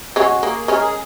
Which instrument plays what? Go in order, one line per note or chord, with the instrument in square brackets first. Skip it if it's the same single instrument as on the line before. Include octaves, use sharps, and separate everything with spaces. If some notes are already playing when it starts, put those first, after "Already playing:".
[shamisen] G#3 C#4 [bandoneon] F#4
[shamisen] A#3 [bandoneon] G#4
[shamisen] G#3 C#4 [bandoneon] A#4
[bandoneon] G#4